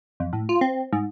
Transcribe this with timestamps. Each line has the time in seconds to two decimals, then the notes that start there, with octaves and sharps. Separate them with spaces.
0.20 F2
0.33 A2
0.49 F4
0.61 C4
0.93 G#2